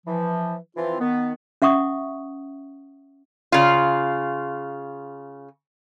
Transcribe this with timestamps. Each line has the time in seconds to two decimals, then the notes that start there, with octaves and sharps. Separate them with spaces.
0.07 E3 F3
0.77 E3 F3 C4 F4
1.00 D#3 B3
1.62 C#4 E5 F#5 C#6 D#6
3.52 C#3 F4